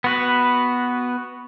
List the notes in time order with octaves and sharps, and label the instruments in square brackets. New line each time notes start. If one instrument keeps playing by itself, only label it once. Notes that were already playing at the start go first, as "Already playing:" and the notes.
[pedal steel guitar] B3 F#4 B4